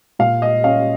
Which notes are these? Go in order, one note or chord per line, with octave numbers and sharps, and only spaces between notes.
A#2 F5
D#5
C#4 F5